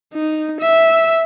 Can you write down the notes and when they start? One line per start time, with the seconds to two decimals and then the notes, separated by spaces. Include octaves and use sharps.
0.14 D#4
0.60 E5